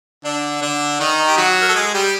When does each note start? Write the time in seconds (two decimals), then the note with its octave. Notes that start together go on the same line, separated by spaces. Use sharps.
0.24 D3 D4
0.62 D3 D4
1.00 D#3 D#4
1.28 G4
1.37 F#3 F#4
1.61 A#4
1.69 A4
1.75 G#3 G#4
1.94 G3 G4